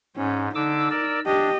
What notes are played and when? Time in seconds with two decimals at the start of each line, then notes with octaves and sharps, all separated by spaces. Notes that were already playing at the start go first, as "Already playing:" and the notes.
0.17 G#2 C#4
0.55 D3 D#4 D6 E6
0.91 A#4 D5 E6
1.26 D4 G4 D#5